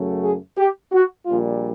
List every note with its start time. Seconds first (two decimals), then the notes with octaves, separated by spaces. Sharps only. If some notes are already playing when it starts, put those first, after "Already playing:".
Already playing: F#2 C#3 F#3 A3
0.22 G#4
0.56 G4
0.92 F#4
1.26 A#1 A#2 G3 F4